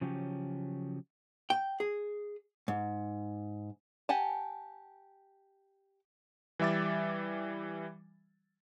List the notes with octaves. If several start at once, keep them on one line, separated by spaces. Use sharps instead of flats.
C#3 F3 F#3 C#4 G4
G5
G#4
G#2
G4 F#5 G#5 A5
E3 G3 E5 D6 A6